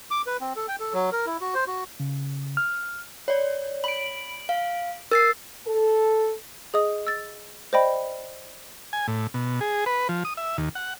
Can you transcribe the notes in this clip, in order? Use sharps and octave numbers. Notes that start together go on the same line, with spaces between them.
D6
B4
C4
A4
G5
A4
F#3
A#4
E4
F#4
C5
F#4
C#3
F6
C#5 D5
B5 D7 F#7
F5
A#4 E6 A6 C7
A4
G#4 D#5 D#6
E6 A6
C5 D5 D#5 G5 B5
G#5
A2
B2
G#4
B4
F3
D#6
E5
D#2
F#5